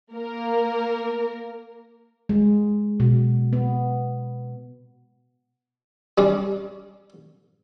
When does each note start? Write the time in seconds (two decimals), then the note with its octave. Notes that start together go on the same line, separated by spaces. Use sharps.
0.13 A#3 A#4
2.29 G#3
3.00 B2
3.53 B3
6.18 G3 C#4 D4